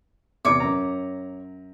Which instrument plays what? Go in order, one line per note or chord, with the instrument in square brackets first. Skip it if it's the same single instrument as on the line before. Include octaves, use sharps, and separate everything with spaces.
[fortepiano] E2 C3 [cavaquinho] C#5 D6
[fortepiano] F#2 A#5